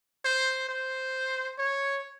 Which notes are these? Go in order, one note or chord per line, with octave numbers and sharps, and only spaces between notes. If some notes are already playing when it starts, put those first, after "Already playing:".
C5
C5
C#5